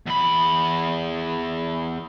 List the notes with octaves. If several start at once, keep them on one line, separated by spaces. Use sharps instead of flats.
E2 B5